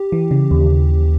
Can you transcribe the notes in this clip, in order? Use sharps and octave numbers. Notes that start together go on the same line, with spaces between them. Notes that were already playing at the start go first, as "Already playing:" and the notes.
Already playing: G4
E3
C#3
D#2